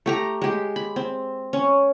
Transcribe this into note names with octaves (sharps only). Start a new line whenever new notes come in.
A3 G4 A#5
G#3 G4
B5
C4
C#4